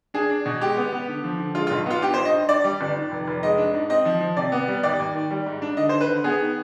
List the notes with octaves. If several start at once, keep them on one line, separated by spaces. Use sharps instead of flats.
D4 G#4
D4
B2
G#3 G4
B3
B3
D3
F3
D3
G#3 F4
B1 F4
B3 F4
G2 G4
G2 C5
D#5
G2
G2 D5
G3
G1
D#3
F1
F1
G#3 D#5
D4
G#2
C4 D#5
F3
F3
C3 D5
B3
G3
D#2 D5
D#2
D#3
G3
G#2
D4
D3 D#5
D3 C5
B4
D3
B3 G#4
D#3